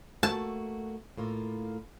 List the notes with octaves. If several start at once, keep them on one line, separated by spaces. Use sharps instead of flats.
A3 A#3 F#4 A5
A2 A#3 F4